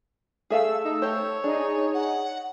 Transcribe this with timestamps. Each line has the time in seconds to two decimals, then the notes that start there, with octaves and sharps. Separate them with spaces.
0.50 A3 G#4 A4 E5 F5 E6
0.84 D#4
1.02 G4 C5 C#5
1.44 D4 D#4 G#4
1.94 F#5